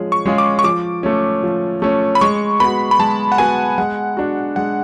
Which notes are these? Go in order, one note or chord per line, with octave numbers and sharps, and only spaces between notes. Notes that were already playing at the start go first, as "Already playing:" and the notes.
Already playing: F3 G#3 C#4 G#4
C#6
G#3 C#4 F4 G#4
D6
C#6
F3 D6
A3 C#4
F3
A3 C#4
B5
G#3 C#6
B3 F#4 B5
B5
G#3 A5
F#5
B3 F#4 G#5
G#3 F#5
D4 F#4
G#3 F#5